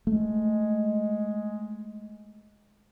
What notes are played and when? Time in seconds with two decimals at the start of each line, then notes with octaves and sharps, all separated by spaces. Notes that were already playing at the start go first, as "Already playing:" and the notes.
0.07 G#3 A3